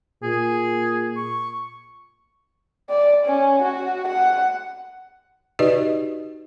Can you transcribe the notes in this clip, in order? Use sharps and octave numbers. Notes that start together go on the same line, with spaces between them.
A#2 G#4
C#6
D5
C#4
F#4
F#5
D#4 F#4 G4 B4 D5 D#5